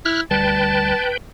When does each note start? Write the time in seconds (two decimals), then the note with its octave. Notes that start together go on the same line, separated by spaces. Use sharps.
0.05 E4 F6 F#6
0.31 D2 G3 B4 G5 A5